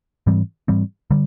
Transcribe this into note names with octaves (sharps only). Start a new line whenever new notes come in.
G#2 E3 G3 C4
G#2 E3 G3 C4
D3 G3